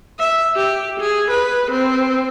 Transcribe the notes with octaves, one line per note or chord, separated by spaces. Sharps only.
E5
G4
G#4
B4
C4